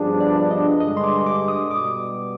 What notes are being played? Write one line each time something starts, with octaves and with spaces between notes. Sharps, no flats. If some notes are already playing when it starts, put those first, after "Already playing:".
Already playing: G2 F3 B3 D4 G#4
D5
D#5
G2 D3 G#3 D#5
C6
D6
D6
D#6
B2 G3 B3 D6